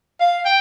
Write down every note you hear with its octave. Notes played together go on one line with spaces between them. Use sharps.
F5
G5